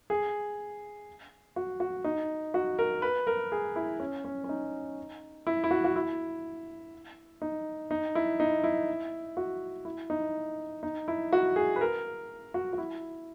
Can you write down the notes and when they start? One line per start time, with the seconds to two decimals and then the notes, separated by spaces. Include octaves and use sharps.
0.10 G#4
1.56 F#4
1.80 F#4
2.04 D#4
2.54 F#4
2.79 A#4
3.02 B4
3.27 A#4
3.52 G#4
3.76 E4
4.00 C#4
4.25 C#4
4.44 C#4
4.49 D#4
5.47 E4
5.64 E4
5.71 F#4
5.84 F#4
5.96 E4
7.42 D#4
7.91 D#4
8.15 E4
8.40 D#4
8.64 E4
9.37 F#4
9.85 E4
10.10 D#4
10.83 D#4
11.08 E4
11.33 F#4
11.56 G#4
11.76 B4
11.81 A#4
12.54 F#4
12.73 F#4
12.78 E4